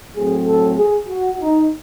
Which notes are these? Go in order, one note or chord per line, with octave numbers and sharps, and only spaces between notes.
A2 F#3 A3 C4 G#4
A4
G#4
F#4
D#4